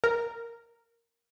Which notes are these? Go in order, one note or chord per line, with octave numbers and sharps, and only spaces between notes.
A#4